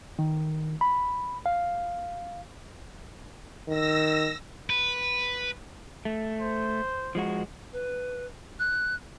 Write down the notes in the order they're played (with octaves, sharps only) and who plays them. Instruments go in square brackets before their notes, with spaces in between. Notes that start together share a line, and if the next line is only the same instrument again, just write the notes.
[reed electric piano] D#3
B5
F5
[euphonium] D#3 [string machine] E6 A#6
[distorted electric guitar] B4
[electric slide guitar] A3
[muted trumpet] C5
[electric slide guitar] F3 G#3 F#4
[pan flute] B4
F#6